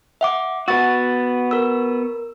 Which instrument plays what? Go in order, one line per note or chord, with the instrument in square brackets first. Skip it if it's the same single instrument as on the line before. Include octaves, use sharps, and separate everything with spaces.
[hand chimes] E5 F#5 D6
[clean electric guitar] B3 F#4 [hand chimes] E6 A6
[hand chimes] A#4 E6